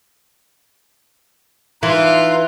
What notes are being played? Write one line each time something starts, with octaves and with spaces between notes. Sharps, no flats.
E3 D#4 F4 B4